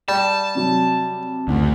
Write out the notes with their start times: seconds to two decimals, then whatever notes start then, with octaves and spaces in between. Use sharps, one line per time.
0.09 G3 A5
0.55 C3 F#3
1.48 F#1 D2